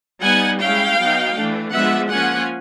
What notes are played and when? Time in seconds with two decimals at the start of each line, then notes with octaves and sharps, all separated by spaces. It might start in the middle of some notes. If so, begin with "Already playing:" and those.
0.23 G3 B3 D#4 F#5 G#5
0.61 G#3 C#4 E4 F5 G5
0.99 F#3 B3 D#4
1.36 E3 A3 D4
1.73 F3 G#3 B3 D4 F4 E5 F#5
2.11 F3 A#3 C#4 F4 F#5 G#5